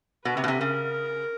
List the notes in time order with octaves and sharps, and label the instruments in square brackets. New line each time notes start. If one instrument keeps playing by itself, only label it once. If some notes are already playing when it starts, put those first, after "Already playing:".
[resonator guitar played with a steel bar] B2 [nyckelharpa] B4
[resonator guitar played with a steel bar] C3
B2
C3
[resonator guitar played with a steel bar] C#3 [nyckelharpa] A#4